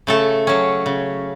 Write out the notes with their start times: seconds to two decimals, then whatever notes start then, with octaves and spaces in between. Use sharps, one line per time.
0.07 C#3 A3 A4
0.47 F#3 C#4
0.86 C#3